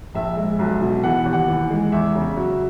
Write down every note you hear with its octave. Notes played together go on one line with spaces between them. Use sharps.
A#1 E5
G#3
B1
B2
E3 F#5
D#2
F#5
E3
G#3
E2 E5
C#3
F#3